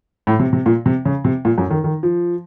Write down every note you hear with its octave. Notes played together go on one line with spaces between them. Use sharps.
A2
C3
C3
A#2
C3
C#3
C3
A#2
F#2
D#3
D#3
F3